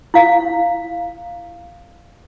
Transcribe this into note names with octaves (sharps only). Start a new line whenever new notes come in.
E4 F5